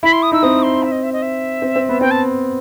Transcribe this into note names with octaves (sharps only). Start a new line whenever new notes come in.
E4 B5
C6
D#6
D#4 E6
C4 D#6
C6
E5
D#5
E5
D#5
E5
C4
C4
B3
C4 G5
A5